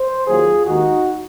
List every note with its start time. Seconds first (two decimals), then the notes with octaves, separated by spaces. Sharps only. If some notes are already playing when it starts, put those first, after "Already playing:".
Already playing: C5
0.26 D#2 D#3 F#3 A#3 F4 G#4
0.66 D#2 D#3 G#3 D#4 F#4